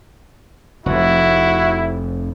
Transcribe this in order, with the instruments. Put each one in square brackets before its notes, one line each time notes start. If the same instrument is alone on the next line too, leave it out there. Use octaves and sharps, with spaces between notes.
[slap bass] F1 F2 [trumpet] E4 [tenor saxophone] F#4